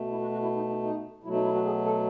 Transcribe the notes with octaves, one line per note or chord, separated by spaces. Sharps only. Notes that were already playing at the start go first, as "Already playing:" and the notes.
Already playing: B2 A3
E4
F#4
F#4
E4
D#4
D#4
D#4
B2 F#3 A3 E4
D#4
E4
F#4
G#4
A4